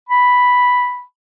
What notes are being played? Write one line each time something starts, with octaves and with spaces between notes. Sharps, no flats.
B5